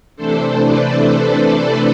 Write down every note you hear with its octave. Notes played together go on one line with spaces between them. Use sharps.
C3 E3 A3 D4 A4 C5
B4 D5